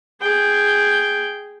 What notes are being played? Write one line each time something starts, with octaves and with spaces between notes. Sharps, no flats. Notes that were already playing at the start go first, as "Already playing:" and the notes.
G#4 G5